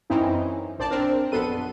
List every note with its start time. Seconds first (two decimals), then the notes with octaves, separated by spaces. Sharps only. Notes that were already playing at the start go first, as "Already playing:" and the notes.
0.10 F#2 E3 C4 C#4 D#4 E4
0.79 A#1 C5 D5 A5
0.91 C4 D4 A#4
1.32 A#1 F#2 B3 A4 C6 D#7